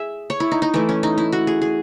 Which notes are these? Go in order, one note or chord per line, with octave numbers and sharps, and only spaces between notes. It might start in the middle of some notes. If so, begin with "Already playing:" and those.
Already playing: G#4 E5
C#5
E4
D#4
D#4
E3 A3 E4
C#4
D#4
E4
F#4
G#4
G#4